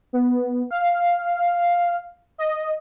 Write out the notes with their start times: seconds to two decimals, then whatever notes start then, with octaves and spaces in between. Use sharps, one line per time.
0.13 B3
0.71 F5
2.38 D#5